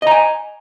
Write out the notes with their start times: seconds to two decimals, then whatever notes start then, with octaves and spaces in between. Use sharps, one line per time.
0.02 D#5
0.07 A#5
0.11 G#5